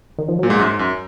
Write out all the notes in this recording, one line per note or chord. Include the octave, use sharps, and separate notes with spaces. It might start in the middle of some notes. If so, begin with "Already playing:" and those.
D#3
F3
A#2 F#3
G#2 G#3
F#2
G#2
F#2